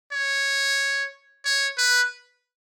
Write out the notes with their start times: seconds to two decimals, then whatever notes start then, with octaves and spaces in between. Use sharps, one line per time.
0.12 C#5
1.45 C#5
1.78 B4